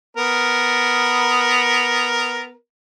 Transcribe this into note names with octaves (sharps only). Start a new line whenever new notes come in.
B3 A#4